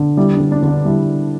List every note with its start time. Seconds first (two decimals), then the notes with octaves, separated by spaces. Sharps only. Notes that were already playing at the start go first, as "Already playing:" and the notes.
Already playing: D3
0.17 G3 E4
0.34 D4
0.40 D3
0.52 D4
0.63 D3
0.68 D4
0.85 G3 E4